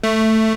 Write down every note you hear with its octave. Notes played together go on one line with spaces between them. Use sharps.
A3